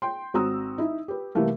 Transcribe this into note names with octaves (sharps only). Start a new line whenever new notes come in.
G5 C6
G#1 C4 F#4 A#5 D#6 E6
D#4 E4
G4 B4
C3 E3 G3 A3 A#3